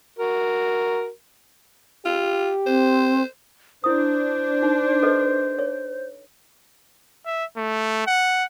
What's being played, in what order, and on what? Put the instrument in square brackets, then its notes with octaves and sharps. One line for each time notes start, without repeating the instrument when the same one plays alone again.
[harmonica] F#4 A#4
[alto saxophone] F4 [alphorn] G4
[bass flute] C4 [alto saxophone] C5
[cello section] D4 [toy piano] E4 D#6 [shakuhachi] C5
[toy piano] D#4
A4 B4 D#5
C#5
[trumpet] E5
A3
F#5